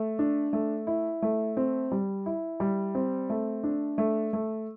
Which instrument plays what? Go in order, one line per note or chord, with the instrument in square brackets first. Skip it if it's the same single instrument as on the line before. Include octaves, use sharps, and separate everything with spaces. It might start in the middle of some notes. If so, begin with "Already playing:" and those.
Already playing: [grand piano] A3
D4
A3
E4
A3
C4
G3
E4
G3
C4
A3
D4
A3
A3